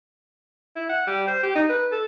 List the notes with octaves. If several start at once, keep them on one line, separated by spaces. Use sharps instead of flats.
E4
F#5
G3
C5
G4
D#4
B4
A4